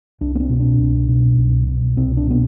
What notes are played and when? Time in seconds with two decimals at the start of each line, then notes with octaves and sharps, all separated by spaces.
0.21 C2 D4
0.35 B3
0.40 C4
0.50 B2
0.60 D4
0.79 C2
1.08 B2
1.38 C2
1.67 B2
1.97 C2 C4
2.17 D4
2.27 B2 B3